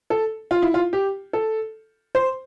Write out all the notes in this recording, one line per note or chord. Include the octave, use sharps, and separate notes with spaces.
A4
F4
E4
F4
G4
A4
C5